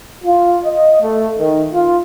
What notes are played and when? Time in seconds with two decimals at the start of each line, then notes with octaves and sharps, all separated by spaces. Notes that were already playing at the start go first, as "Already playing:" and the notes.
0.25 F4
0.64 D#5
1.01 A3
1.39 D#3
1.73 F4